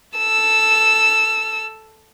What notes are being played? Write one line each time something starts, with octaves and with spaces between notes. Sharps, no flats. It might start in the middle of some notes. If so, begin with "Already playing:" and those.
A4 E6